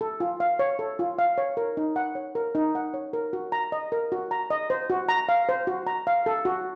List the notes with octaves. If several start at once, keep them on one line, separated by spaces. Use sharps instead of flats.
A4
F4
F5
C#5
A4
F4
F5
C#5
A#4
D#4
F#5
C#5
A#4
D#4
F#5
C#5
A#4
F#4
A#5
D#5
A#4
F#4
A#5
D#5
C5
F#4
A#5
F5
C5
F#4
A#5
F5
A4
F#4